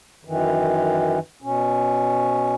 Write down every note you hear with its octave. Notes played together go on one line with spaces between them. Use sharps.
F#2 D#3 E3
B2 C#4